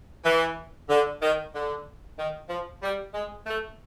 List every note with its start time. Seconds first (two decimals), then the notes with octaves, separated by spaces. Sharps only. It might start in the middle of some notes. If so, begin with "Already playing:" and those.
0.25 E3
0.89 D3
1.22 D#3
1.53 D3
2.18 D#3
2.49 F3
2.82 G3
3.14 G#3
3.47 A3